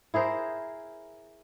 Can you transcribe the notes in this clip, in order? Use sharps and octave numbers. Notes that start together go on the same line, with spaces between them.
E4 G#4 A#4 C5